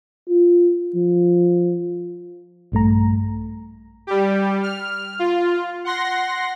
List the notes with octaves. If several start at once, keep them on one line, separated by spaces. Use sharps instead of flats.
F4
F3
A#1 G2 A3 A#5
G3 G4
F6
F4
F#5 C6 A#6